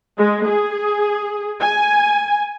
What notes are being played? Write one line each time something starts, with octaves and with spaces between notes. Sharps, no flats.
G#3
G#4
G#5